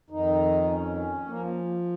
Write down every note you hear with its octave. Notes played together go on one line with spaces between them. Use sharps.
F2 D#3 D#4
C#4
F3 A#3